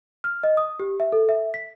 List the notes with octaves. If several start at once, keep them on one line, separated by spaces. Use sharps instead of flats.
F6
D#5
D#6
G4
E5
A4
E5
B6